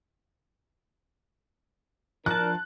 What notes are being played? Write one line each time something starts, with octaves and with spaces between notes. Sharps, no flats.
F3 D4 A#4 A5 F#6